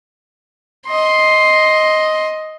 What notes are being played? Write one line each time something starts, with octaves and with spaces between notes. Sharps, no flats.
D#5 C6